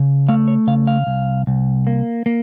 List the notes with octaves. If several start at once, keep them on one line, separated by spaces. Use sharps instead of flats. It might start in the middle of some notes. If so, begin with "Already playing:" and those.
Already playing: C#3
A3 F5
C#5
C#3 F5
F5
C2
C2
A#3
A#3